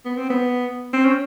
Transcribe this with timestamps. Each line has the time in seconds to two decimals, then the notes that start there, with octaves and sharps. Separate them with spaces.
0.05 B3
0.17 C4
0.30 B3
0.93 C4
1.05 C#4